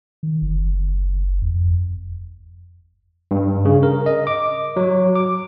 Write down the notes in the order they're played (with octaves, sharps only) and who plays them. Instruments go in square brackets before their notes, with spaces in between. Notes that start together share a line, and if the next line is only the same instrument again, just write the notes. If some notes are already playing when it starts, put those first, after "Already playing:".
[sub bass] D#3
F#1
F2
[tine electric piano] G2
C#3
A#4
D#5
D6
F#3
D6